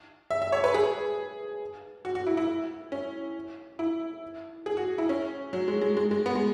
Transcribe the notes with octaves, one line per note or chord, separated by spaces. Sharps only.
E5
E5
C#5
B4
G#4
F#4
F#4
E4
E4
C#4
E4
G#4
F#4
E4
C#4
F#3
G#3
G#3
G#3
G#3
B3
G#3